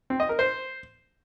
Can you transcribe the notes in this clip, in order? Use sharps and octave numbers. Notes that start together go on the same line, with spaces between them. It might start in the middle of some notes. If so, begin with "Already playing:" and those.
C4
D#5
A#4
C5